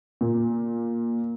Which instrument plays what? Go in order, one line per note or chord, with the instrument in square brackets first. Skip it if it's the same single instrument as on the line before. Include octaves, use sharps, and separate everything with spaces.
[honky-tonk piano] A#2